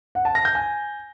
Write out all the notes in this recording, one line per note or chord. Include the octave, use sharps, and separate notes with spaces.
F#5
A5
A#6
G6
G#5